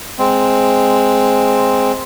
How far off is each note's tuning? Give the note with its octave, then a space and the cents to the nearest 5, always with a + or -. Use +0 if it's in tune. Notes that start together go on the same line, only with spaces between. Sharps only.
G#3 +0 C4 +0